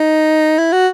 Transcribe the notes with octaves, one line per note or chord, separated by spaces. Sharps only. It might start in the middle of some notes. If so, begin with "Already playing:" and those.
Already playing: D#4
E4
F#4